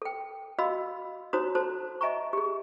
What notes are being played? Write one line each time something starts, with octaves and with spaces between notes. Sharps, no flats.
A4 G5
F#4 D#5 F5 B5 E6
D#4 F#4 C5 C#5 A#5 D#6
F#4 A4 C5 A5
D#5 E5 G#5 A#5 C#6
G4 G#4